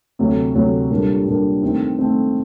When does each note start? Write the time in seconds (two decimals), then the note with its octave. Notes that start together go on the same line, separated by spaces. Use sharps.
0.19 D2 C3 F#3
0.55 D2 C3 F#3
0.90 A#2 G3 D4 G4 A#4
1.26 A#2 G3 D4 G4 A#4
1.63 D#3 A3 C4
1.99 D#3 A3 C4